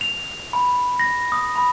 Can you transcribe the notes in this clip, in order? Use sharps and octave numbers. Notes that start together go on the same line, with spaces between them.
F7
B5
A#6
D#6
B5